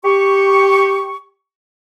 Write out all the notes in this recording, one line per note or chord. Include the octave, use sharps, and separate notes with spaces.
G4 C#6